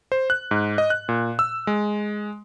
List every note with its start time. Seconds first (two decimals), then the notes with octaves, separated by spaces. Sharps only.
0.12 C5
0.30 F#6
0.51 G#2
0.78 D#5
0.90 F#6
1.09 A#2
1.39 E6
1.67 G#3